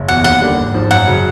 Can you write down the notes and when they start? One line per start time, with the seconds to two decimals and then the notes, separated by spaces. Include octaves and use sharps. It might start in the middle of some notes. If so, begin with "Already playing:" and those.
Already playing: F#1
0.08 E2 B2 F#5
0.24 D#2 F#5
0.41 D3 G3 A#3 D4
0.58 G#1
0.74 G#2 F3
0.91 F#2 F#5
1.07 C#3 F#3